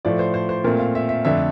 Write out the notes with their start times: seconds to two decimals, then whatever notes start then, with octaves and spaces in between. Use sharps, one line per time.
0.05 A2 F3 A3 D5
0.19 C5
0.34 C5
0.49 C5
0.64 A#2 A3 C4 A#4
0.79 F5
0.95 E5
1.09 E5
1.25 F2 D3 A3 D4 E5